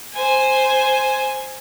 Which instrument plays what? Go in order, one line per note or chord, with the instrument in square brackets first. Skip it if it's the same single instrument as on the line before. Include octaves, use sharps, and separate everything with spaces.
[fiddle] C5 G#5